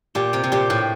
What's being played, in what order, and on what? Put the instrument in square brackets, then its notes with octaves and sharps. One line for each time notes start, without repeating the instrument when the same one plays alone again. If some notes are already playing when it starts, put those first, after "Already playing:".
[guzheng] A#2 [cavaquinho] G4
[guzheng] C3 [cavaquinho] G5
[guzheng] C3
[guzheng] A#2 [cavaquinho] G4
[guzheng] A2 [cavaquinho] G5